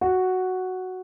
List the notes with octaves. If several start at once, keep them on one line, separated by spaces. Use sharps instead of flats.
F#4